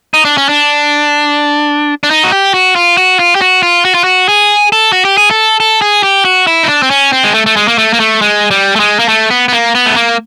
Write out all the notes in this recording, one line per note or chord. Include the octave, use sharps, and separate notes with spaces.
D#4
D4
C#4
D4
D4
D#4
F#4
G4
F#4
F4
F#4
F4
G4
F#4
F4
F#4
F4
F#4
G#4
A4
F#4
G4
G#4
A4
A4
G#4
G4
F#4
E4
D#4
D4
C4
C#4
C4
G#3
A3
A3
G#3
A#3
A3
A#3
A3
G#3
G3
A3
G#3
A#3
A3
B3
B3
A#3
B3
A3
A#3